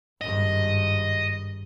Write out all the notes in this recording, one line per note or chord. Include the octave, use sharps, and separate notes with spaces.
G#1 G2 D#5